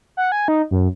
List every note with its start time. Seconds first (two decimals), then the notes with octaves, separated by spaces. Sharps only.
0.17 F#5
0.32 G#5
0.48 D#4
0.71 F#2